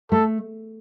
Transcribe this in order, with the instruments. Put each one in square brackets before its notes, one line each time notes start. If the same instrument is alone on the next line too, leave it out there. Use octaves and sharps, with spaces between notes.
[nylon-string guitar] A3 [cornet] A4